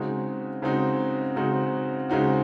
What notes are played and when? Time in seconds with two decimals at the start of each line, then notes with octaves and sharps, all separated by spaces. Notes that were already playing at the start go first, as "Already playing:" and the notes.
Already playing: C#3 G#3 C4 D#4 F#4
0.62 C#3 G#3 C4 D#4 F#4
1.36 C#3 G#3 C4 D#4 F#4
2.09 C#3 G#3 C4 D#4 F#4